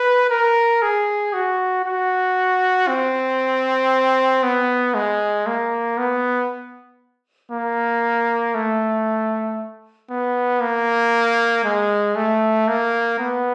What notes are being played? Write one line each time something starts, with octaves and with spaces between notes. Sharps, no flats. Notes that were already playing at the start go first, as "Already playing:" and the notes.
Already playing: B4
A#4
G#4
F#4
F#4
C4
B3
G#3
A#3
B3
A#3
A3
B3
A#3
G#3
A3
A#3
B3